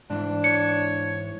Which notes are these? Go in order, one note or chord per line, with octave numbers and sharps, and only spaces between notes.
G#2 E3 D4
C#5 C#7